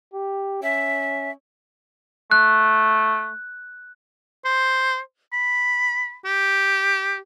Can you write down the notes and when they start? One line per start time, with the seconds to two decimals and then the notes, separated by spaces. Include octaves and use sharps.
0.14 G4
0.63 C#4 E5
2.31 A3 F#6
4.45 C5
5.33 B5
6.25 G4